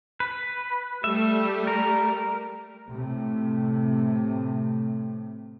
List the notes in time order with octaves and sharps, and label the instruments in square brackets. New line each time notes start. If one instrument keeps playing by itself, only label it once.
[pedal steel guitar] B4
[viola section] G3 A3 [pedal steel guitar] E5
[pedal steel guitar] A#4
[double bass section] A2 C3 A3